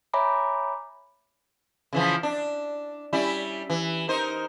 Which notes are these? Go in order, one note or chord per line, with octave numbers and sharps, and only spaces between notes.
C#5 E5 G#5 A#5 B5 D6
C#3 E3 F3
D4
G3 C#4 E4
E3
D#4 A#4 C5